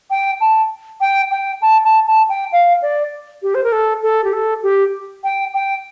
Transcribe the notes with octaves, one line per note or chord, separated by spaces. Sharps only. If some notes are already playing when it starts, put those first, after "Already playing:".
G5
A5
G5
G5
A5
A5
A5
G5
F5
D5
G4
C5
A#4
A4
A4
G4
A4
G4
G5
G5